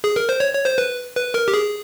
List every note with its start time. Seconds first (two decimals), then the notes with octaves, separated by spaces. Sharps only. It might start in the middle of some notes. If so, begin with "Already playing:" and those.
0.04 G#4
0.16 A#4
0.29 C5
0.40 C#5
0.54 C#5
0.66 C5
0.78 B4
1.16 B4
1.34 A#4
1.48 G4
1.54 G#4